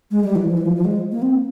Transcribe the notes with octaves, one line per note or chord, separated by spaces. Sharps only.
G#3
G3
E3
F3
E3
F3
F3
G#3
A#3
C4